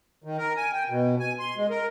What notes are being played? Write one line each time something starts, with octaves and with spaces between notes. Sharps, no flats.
D#3
A#4
G#5
G5
B2
G#5
C6
G#3
A#4